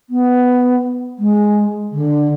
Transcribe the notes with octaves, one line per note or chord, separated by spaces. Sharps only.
B3
G#3
D3